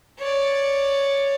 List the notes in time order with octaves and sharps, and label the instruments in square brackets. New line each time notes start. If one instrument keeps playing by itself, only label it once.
[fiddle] C#5 D5